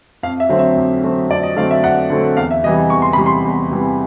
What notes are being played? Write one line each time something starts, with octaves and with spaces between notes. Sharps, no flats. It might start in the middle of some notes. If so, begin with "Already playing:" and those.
F2 F5
E5
D3 F#3 A3 C4
E5
F2
D3 F#3 A3 C4
F2 D5
D#5
D3 F#3 A3 C4 F5
E5
F2 F#5
D3 F#3 A3 C4
E2 F5
E5
C3 E3 G3 D#5
E2 C#6
C6
C3 E3 G3 B5
C6
E2
C3 E3 G3